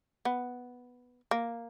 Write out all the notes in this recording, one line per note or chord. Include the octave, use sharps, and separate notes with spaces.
B3
A#3